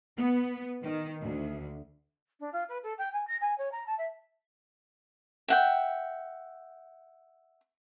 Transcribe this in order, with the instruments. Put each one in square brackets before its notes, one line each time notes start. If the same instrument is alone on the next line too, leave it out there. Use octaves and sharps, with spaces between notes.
[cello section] B3
D#3
D2
[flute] D4
F4
B4
A4
G5
G#5
A#6
G#5
C#5
A#5
A5
E5
[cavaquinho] E5 F#5 G5